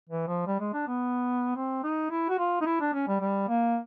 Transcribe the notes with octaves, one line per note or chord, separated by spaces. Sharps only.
E3
F3
G3
G#3
D4
B3
C4
D#4
E4
F#4
F4
D#4
E4
D4
C#4
G3
G3
A#3